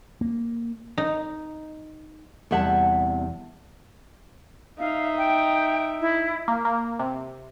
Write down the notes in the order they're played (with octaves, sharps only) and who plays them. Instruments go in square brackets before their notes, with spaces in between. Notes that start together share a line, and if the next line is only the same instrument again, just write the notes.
[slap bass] A#3
[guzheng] D#4
[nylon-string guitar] E2 C3 G3 E5 F#5 A5
[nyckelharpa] D#4 E5 [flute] F5
[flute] G5
E4
[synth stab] A#3
A#3
C3